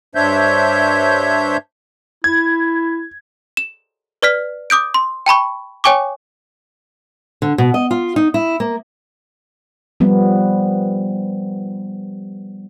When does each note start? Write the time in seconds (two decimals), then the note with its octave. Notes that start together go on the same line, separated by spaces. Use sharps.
0.15 G2 D4 C5 C#5 E5 G6
2.24 E4 G#6
3.57 E7
4.22 B4 D5 F6 B6
4.70 D6 D#6 G6 D7
4.94 C6
5.26 G5 A5 B5 C#6
5.84 C#5 G5 G#5 C#6 D6
7.42 D3
7.58 B2
7.74 D#5
7.91 F4
8.16 D#4
8.34 E4
8.60 A#3
10.00 F3 G3 B3